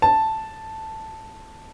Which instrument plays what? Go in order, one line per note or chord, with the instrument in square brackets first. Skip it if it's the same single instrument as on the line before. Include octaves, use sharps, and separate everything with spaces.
[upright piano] A5